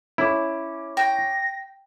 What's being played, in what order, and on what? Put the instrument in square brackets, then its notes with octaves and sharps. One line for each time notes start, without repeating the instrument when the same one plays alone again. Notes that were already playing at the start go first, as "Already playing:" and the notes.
[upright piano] C#4 D6 [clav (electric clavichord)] E4
[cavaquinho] G5 [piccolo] A#6